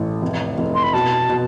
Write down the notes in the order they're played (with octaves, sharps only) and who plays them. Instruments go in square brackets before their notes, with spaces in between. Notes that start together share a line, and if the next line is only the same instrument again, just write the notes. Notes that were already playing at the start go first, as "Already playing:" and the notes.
Already playing: [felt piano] A1 A3
F1
F1
[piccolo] C6
B5
[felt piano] B2 [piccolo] A5
[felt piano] B2